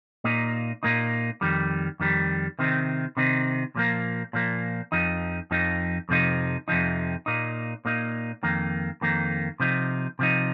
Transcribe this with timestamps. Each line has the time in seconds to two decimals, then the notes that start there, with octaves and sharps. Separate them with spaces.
0.24 A#2 A#3 D#4
0.83 A#2 A#3 D#4
1.41 F2 D#3 G3
2.00 F2 D#3 G3
2.59 C3 D#3 C4 D#4
3.17 C3 D#3 C4 D#4
3.75 A#2 F3 A#3
4.33 A#2 F3 A#3
4.92 F2 F3 D#4
5.51 F2 F3 D#4
6.09 F2 C3 F3 D#4
6.68 F2 C3 F3 D#4
7.26 A#2 A#3 D#4
7.85 A#2 A#3 D#4
8.43 F2 D#3 A#3
9.01 F2 D#3 A#3
9.60 C3 F3 D#4
10.19 C3 F3 D#4